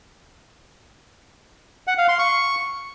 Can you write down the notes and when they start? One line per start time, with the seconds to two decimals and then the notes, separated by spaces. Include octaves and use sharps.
1.87 F#5
1.98 F5
2.08 C6
2.19 C#6